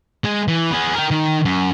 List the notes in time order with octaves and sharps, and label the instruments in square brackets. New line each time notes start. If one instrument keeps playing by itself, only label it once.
[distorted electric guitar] G#3
E3
B3 G#4
A#4 G5
D#3
F#2